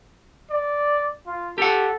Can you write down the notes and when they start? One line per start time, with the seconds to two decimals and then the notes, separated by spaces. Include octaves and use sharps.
0.50 D5
1.27 F4
1.58 G4 A4 F#5